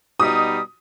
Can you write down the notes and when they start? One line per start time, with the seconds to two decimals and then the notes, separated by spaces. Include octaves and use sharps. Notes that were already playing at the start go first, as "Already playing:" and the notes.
0.20 B2 G3 D#4 D#6